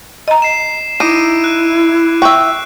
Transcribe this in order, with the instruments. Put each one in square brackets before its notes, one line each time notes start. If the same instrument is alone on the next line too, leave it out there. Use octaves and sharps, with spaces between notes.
[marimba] D#5 A#5
[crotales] C7 E7
[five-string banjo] D#4 [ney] E4 [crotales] D6 D7 D#7
[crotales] F#6
[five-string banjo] E5 G5 [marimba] C#6 [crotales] F#6